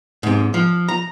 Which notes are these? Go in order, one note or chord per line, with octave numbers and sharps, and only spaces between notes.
G#2 C3
F3
A#5